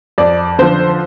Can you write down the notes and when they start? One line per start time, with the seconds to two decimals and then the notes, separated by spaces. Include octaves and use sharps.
0.18 F2 D5
0.59 D3 F3 C5